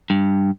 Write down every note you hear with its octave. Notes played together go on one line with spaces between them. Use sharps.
G2